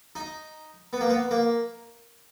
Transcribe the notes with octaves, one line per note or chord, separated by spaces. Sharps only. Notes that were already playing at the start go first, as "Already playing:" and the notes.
D#4
B3
A#3
B3
A#3